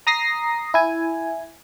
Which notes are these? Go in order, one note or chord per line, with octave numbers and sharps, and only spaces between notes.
A#5 D#6 A#6 C7
E4 G#5